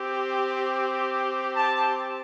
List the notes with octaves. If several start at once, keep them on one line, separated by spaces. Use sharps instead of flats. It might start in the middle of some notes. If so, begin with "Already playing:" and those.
Already playing: C4 G4
A5